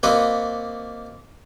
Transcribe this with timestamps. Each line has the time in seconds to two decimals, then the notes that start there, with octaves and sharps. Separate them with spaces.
0.03 A#3 C4 F#4 B4 D5 D#5